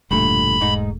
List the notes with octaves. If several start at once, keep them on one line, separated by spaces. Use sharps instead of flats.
E1 G2 A#2 D3 A3 B5
G#2 D#4